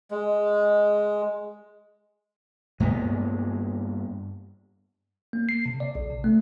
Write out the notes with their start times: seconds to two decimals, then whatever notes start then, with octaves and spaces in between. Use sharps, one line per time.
0.11 G#3
2.80 G2 G#3 A#3 B3
5.33 A#3
5.49 C7
5.66 C3
5.80 D5
5.95 A#1
6.10 C3
6.24 A3